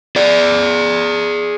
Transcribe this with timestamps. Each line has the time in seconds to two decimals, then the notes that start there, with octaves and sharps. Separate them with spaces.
0.16 G#4 D5